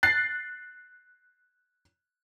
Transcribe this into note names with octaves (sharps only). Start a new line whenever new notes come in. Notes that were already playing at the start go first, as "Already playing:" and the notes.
F#6 A6 C7